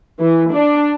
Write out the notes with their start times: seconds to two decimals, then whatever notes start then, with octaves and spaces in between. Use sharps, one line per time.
0.20 E3
0.51 D4